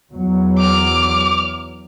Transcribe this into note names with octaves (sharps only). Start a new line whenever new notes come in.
E2 F#3
D6 F6